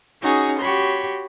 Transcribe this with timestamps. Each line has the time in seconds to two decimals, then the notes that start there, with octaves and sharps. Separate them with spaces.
0.21 C#4 D#4 F#4 G#4
0.59 F#4 G4 C#5 B5 C6